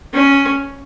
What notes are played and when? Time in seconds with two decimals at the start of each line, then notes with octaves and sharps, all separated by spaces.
0.13 C#4